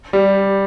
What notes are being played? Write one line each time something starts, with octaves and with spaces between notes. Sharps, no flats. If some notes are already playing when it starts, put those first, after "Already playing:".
G3